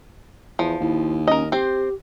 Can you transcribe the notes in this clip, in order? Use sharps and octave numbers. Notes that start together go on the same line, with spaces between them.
E2 F3
D#2 E4
C#4 A#4 D#5
C4 G4 C5